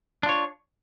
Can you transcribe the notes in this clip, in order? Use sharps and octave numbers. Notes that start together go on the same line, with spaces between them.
D4 F4 C#5